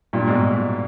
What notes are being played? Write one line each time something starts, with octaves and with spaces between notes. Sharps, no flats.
G2 A#2
G#2 B2